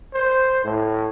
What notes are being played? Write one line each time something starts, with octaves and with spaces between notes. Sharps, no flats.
C5
A2